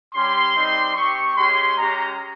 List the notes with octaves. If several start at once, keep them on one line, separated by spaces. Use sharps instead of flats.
G3 C#4 G4 C6
G3 C4 D#4 G4
C4 G4 C#6
G#3 C#4 G4 C6
G#3 C#4 G4 A#5